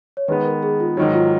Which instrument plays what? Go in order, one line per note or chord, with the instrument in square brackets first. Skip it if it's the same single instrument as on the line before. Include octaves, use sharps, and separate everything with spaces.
[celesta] C#5
[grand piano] D#3 G#3 B3 [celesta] B4
[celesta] A#4
G#4
F4
[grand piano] G#2 D#3 F#3 [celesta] D#4
[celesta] F4